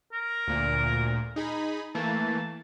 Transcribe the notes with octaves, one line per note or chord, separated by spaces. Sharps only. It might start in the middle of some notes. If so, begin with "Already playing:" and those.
A#4
D2 A#2
D#4 G#4 B5
E3 A3 A#3 A5